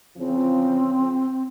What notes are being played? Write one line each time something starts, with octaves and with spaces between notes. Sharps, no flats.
E2 C#3 F3 C4